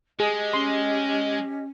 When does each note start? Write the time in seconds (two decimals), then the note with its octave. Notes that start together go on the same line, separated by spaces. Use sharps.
0.20 G#3 G4 G#4 D#5
0.53 C#4 C6